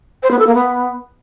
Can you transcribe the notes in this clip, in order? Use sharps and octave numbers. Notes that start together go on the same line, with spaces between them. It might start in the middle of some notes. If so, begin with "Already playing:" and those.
C5
B3
A4
A#3
B3